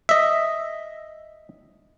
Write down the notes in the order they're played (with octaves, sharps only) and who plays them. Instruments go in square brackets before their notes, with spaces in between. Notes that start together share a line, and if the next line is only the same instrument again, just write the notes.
[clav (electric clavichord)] D#5 E5